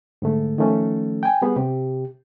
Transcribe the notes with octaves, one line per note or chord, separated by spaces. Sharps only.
G#2 D3 A3
D#3 F3 A3 C#4
G5 G#5
G3 B3 G#4
C3 G4